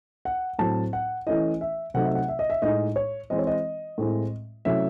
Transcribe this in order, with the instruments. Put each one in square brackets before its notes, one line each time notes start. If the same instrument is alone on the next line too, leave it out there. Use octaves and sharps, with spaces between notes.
[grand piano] F#5
A2 F#3 C4 A5
F#5
E3 A3 C#4 E4 D#5
E5
C3 F#3 A3 C4 D#4 F#5
E5
F#5
E5
D#5
E5
A2 G#3 D#4 D#5
C#5
E3 G#3 C4 D#5
C#5
D#5
A2 G#3 C4 E4
C3 F#3 A3 C#4 E4 E5